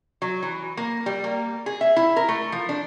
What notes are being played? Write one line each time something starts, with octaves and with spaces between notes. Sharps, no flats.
F#3
E3
A#3
G3
A#3
G#4
E5
E4
A#4
A3
F3
D4